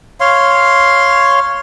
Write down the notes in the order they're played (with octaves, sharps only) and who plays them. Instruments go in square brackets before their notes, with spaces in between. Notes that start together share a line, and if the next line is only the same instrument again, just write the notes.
[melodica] C#5 F5 C6